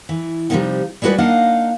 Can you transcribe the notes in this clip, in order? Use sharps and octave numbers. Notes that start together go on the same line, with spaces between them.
E3
C3 F3 G3 A#3 C#4 D#4
G3 G#3 F#4 G#4 B4 D5
A#3 D4 D#4 D#5 F5 F#5